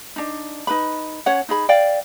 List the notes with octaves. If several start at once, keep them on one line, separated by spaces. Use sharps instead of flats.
D4 D#4
D#4 B4 B5
C#4 C#5 F#5
D#4 G#4 B5
D5 F5 G5